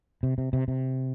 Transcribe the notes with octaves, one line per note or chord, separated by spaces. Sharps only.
C3
C3
C3
C3